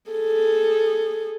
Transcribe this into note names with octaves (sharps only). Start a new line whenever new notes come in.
G#4 A4